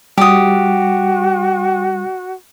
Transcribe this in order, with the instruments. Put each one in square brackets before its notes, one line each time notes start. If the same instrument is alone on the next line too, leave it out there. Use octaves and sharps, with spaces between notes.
[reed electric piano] G3 [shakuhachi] F#4 [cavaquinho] G4 D#6